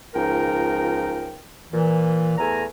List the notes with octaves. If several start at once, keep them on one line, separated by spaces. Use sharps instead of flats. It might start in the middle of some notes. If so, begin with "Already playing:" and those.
C#2 F3 D#4 A#4 G5
A#2 E3
E2 A3 G#5 A#5